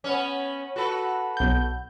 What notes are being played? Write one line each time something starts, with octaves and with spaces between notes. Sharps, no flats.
B3 C#4
F#4 A4 B4
B1 G6